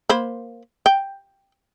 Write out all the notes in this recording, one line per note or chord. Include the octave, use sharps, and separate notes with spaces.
A#3 C5 B5
G5